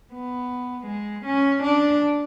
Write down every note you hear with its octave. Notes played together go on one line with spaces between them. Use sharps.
B3
G#3
C#4
D4